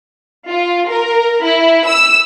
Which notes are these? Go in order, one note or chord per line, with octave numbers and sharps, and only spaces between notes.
F4
A#4
E4
E6